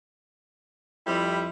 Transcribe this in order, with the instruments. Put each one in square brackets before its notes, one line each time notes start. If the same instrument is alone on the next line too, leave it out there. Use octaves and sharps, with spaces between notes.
[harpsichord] F2 [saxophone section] G3 E4